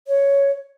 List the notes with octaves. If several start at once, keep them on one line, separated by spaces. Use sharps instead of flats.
C#5